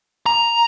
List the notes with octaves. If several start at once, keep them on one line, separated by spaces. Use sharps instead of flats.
A#5